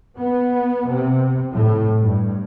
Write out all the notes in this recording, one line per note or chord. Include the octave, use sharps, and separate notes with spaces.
B3
C3
A2
G2